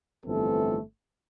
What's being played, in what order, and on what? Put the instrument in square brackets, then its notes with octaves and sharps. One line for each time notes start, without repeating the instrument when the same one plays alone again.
[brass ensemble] G1 F2 E3 A3 C4 A4